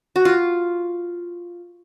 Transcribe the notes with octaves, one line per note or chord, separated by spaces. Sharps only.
F#4
F4